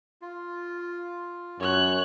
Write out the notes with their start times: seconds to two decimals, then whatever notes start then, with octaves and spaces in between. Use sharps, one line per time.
0.22 F4
1.60 F#2 C#5 F#6